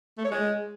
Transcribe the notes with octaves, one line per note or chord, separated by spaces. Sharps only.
A3
C#5
G#3